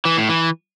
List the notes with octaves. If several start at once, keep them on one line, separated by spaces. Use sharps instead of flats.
E3
A2
E3